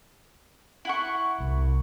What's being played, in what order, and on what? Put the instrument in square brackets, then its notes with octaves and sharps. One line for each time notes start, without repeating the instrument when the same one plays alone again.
[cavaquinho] E4 F#5 C#6
[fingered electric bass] C2